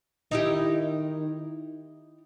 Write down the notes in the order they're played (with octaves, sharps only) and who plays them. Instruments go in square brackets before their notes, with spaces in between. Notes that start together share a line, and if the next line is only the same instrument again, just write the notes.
[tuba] D#3 [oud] D#4 E4 G4